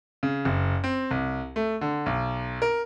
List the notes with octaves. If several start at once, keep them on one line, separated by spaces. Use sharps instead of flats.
C#3
F#1
C4
C2
A3
D3
B1
A#4